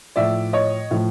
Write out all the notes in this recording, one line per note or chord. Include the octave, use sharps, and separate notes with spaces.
A2 F3 D5 E5
C#5 D#5
A2 F3